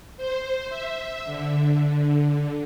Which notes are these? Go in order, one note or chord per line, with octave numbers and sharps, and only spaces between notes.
C5
E5
D3